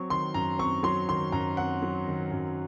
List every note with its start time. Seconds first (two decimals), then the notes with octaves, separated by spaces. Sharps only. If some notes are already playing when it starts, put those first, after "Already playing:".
Already playing: F#3 C4 C#6
0.10 D#3 C6
0.34 F#2 A#5
0.59 C4 C#6
0.83 F#3 C6
1.08 D#3 C6
1.32 F#2 A#5
1.57 C4 F#5
1.82 F#3
2.07 D#3
2.32 F#2